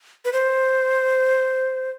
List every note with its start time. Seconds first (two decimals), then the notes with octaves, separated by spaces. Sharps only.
0.25 B4
0.33 C5